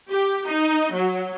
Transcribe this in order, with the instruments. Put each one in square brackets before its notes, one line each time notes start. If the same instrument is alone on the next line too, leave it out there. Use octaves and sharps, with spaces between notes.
[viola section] G4
D#4
F#3